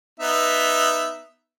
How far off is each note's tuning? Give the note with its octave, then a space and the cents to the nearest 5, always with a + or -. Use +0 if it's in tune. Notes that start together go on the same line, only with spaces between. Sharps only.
B3 +0 D#4 +0 E5 +0